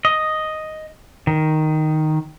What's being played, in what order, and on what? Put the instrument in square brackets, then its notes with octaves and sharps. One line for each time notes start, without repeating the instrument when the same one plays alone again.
[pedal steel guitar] D#5
D#3